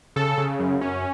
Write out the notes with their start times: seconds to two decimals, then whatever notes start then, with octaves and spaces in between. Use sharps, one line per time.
0.16 C#3 A4
0.38 C#3
0.59 F#2
0.81 C#4